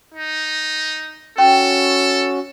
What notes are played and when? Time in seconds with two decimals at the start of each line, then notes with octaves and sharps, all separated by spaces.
0.14 D#4
1.38 C#4 F#4 A4 G5